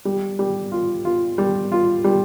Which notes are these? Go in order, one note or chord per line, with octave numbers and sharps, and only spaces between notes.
G3
G3
F4
F4
G3
F4
G3